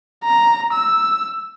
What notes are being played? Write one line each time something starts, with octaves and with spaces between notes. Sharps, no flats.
A#5
E6